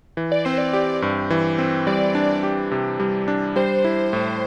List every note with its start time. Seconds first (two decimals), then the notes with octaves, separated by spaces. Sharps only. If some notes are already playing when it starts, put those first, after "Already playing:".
0.17 E3
0.32 D5
0.45 C4 C5
0.58 D5
0.73 G4
1.02 G2
1.30 E3
1.58 C4
1.87 G3 D5
2.15 D4
2.43 G4
2.71 C3
3.00 G3
3.28 D4
3.56 G3 C5
3.84 E4
4.13 A2